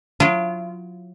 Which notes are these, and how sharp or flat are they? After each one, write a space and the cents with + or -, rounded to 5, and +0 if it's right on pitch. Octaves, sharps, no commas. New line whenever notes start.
F#3 -40 F4 -40